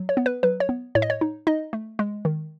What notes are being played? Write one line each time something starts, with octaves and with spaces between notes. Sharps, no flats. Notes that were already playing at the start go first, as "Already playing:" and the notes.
Already playing: F#3
C#5
B3
B4
F#3 B4
C#5
B3
A2 C#5
D#5
C#5
D#4
D#4 D#5
A3
G#3
D#3